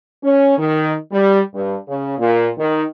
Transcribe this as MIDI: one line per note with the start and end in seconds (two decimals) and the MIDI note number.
0.23 0.57 61
0.58 0.93 51
1.12 1.39 55
1.54 1.75 43
1.88 2.18 49
2.18 2.48 46
2.58 2.84 51